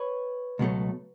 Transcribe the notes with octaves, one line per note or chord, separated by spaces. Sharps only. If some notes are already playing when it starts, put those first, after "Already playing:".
Already playing: B4 C#5
C#2 B2 F#3 A3